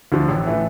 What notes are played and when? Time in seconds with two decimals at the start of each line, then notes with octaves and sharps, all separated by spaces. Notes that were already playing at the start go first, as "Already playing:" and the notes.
0.12 D2 D3 F3
0.29 A1
0.46 A2 E3 A3